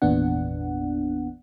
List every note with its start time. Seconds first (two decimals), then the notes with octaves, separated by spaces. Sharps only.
0.02 G#1 E2 A#2 B3 D4 F#5